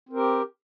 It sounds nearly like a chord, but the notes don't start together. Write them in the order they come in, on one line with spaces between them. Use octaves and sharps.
C4 A#4 G4